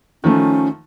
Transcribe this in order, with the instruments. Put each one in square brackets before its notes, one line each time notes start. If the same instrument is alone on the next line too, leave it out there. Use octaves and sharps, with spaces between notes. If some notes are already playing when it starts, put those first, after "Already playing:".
[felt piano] D#3 F3 A3 [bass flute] C#4